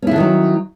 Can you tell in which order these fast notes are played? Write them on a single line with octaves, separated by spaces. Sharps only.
C#4 E4 D3 D#3 F#3